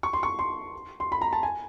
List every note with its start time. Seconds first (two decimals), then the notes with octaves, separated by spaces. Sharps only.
0.03 C#6
0.13 C6
0.23 C#6
0.39 C6
1.00 C6
1.12 B5
1.21 A#5
1.33 A5
1.43 G#5